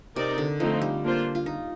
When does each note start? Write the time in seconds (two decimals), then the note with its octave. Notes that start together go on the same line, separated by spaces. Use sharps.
0.16 C3 C4 D#4 A#4 D5
0.38 D3
0.59 F3 A3 C4 D#4
0.82 G3
1.04 A#3 D4 F4 C5
1.35 F4
1.46 D#4